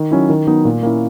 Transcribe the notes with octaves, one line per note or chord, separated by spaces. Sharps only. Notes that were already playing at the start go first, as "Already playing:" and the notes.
Already playing: D#3
F#3 C#4 E4
D#3
F#3 B3 D#4
A#2
A#3 C#4 E4